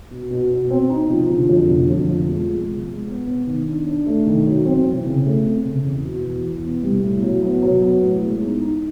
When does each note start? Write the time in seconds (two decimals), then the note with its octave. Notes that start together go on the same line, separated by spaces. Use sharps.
0.11 B2
0.31 B2
0.51 B2
0.70 C4
0.90 D#4
1.10 F3
1.30 D3
1.49 F2
1.69 D3
1.89 F2
2.09 F3
2.28 G#3
2.48 G#3
2.68 F3
2.87 G#3
3.08 B3
3.27 B3
3.47 D#3
3.67 D4
3.87 D4
4.06 A3
4.26 D#3
4.46 F#3
4.66 C4
4.85 E3
5.05 C#3
5.25 A3
5.45 C4
5.65 C#3
5.84 E2
6.04 B2
6.24 E2
6.44 E2
6.63 B3
6.83 G3
7.03 A2
7.22 F#3
7.42 B3
7.62 F#3
7.82 B3
8.02 A2
8.22 G#3
8.41 D#4
8.61 D#4